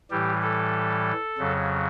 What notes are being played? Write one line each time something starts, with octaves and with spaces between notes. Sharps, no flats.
A2 E3 G3 G4
A4
F2 C#3 F#3